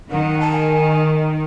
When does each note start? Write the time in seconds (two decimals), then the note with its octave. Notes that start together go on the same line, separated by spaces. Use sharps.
0.11 D#3 F#5
0.40 A5
0.52 G#5